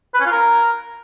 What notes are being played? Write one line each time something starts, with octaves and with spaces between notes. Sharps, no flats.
B4
C#4
F4
A#4